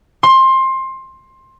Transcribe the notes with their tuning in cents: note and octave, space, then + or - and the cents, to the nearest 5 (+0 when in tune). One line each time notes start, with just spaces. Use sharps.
C6 +20